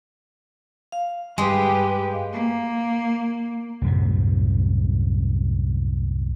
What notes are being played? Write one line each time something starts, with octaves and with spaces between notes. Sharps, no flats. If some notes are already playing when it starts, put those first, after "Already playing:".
F5
G2 G#3 G4 B4
A#3
C2 F#2 A2 C3